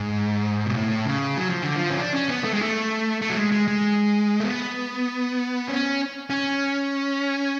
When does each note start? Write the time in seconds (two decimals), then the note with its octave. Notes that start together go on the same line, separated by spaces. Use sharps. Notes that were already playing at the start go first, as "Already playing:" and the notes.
Already playing: G#2
0.66 B2
0.75 A2
1.06 C#3
1.37 F#3
1.50 F3
1.63 D3
1.76 F3
1.90 C#4
1.99 D4
2.14 C#4
2.29 B3
2.44 A3
2.53 G#3
2.62 A3
3.22 A3
3.30 F#3
3.37 G#3
3.52 G#3
3.68 G#3
4.40 A3
4.45 B3
5.68 C#4
6.30 C#4